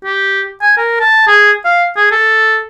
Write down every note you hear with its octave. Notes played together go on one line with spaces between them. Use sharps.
G4
G#5
A#4
A5
G#4
F5
G#4
A4